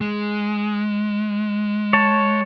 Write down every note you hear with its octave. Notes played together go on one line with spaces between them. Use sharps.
G#3
C#5 A5